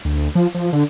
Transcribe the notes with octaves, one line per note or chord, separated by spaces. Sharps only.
D2
F3
F3
D3